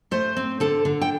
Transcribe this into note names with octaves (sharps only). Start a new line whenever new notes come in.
A3 C5
C4
D3 A4
D3
G5